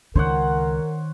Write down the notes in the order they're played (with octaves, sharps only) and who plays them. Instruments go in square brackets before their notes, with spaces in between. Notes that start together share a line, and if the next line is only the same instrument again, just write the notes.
[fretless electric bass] C#2 [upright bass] D#3 [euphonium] A#4 [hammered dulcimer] C5 C#5 F#5